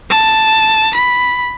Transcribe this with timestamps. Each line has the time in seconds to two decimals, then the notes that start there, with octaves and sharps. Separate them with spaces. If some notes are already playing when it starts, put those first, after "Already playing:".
0.10 A5
0.96 B5